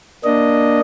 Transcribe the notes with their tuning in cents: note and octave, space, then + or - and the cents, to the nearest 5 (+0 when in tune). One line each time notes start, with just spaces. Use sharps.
A#3 +15 D4 +0 D#5 +0